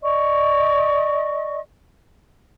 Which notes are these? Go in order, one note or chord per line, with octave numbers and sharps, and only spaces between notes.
D5 D#5 C#6